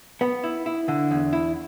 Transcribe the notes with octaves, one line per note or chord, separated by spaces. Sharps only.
B3
E4
E4
D3
E2
E4